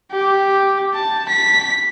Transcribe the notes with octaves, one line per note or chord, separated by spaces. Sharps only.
G4
A5
B6